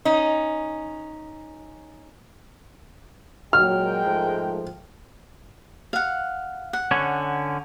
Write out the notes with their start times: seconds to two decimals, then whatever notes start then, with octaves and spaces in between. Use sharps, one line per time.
0.05 C#4 D#4
3.53 A#2 F#3 G#3 A#4 G5 F6
4.05 G#2 F3 A3
5.93 F5 F#5
6.73 F#5
6.91 D3 C#4 C#5